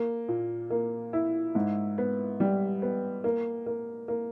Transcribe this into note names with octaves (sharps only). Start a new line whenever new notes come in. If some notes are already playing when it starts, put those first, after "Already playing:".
Already playing: A#3
A#2
A#3
E4
G#2
B3
G3
B3
A#3
A#3
A#3